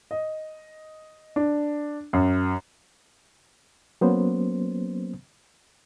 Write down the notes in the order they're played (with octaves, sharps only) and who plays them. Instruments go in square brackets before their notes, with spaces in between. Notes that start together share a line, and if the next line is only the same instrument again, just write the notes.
[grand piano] D#5
D4
F#2
[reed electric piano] F#3 A#3 B3 C#4 C5